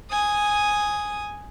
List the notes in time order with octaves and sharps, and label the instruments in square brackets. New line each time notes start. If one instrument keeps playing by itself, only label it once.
[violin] G#5 D#6